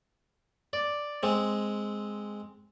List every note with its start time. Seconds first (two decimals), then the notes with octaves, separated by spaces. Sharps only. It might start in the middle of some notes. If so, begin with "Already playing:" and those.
0.73 D5
1.23 G#3 C4